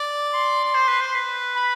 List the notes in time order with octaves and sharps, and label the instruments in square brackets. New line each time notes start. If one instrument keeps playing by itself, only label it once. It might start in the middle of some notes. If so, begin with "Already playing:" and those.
Already playing: [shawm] D5
[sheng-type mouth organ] C6
[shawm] D5
C5
B4
C5
B4
[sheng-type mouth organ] B5